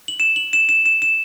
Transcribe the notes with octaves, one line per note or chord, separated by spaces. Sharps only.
F#7
E7
F#7
E7
E7
E7
E7